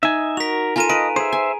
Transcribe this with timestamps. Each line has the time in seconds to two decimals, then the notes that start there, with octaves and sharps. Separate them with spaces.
0.03 D#4 E5 G#5
0.37 F#4 A#4 B6 F7
0.76 F4 A4 A#4 G#5 A#5 D#7
0.89 B4 D#5 D7
1.16 G#4 C5 E5 D#7
1.33 G#5